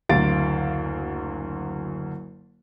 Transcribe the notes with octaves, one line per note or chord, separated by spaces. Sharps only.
F#1 D2 F#3 F5 A6 D7